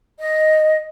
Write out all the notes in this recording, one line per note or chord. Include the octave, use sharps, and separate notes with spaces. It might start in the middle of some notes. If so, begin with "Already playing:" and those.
D#5